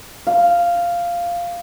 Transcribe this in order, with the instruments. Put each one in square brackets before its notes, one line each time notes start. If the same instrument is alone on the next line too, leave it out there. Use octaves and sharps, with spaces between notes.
[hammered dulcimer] F5